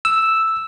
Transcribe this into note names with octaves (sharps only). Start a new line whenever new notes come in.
E6